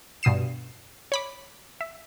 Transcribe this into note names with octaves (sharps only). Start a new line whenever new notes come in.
G2 B2 D#6 C7 E7
C#5 B5 D6
E5